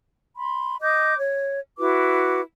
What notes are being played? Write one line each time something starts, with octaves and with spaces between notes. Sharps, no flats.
B5 C6
D#5 D6 G6
C#5
E4 F#4 B4 D6